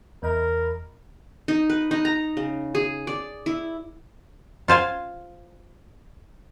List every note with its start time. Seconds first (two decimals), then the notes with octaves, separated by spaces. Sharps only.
0.23 E2 A#4 D#5 B5
1.48 D#4
1.70 B4
1.91 D#4
2.05 A#5
2.37 C#3
2.75 G#4
3.07 D5
3.46 E4
4.68 F4 C5 F5 G#5